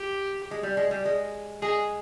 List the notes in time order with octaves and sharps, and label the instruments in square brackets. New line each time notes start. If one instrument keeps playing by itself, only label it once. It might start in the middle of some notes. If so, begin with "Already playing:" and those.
Already playing: [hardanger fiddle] G4
[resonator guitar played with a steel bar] G#3
G3
G#3
G3
G#3
[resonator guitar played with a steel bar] G#3 [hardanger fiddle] G#4